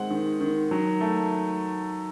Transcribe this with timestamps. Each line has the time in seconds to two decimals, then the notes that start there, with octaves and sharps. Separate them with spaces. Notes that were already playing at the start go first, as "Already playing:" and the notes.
Already playing: D#3 G#3 C4 F#5
0.10 D#3
0.41 D#3
0.71 F#3
1.01 A3